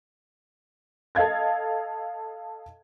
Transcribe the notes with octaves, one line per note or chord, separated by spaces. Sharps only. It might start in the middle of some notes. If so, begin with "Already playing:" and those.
A4 D#5 F5 G#6 A6